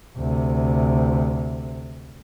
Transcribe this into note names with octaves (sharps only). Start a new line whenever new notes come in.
D2 C3